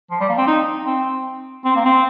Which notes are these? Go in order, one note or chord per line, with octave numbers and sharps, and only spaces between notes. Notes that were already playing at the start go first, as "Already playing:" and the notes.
F3
G3
A#3
C4
D#4
C4
C4
A#3
C4